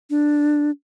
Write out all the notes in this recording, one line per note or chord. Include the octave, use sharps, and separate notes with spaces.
D4